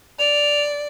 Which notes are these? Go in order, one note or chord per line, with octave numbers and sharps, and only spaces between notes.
D5 F7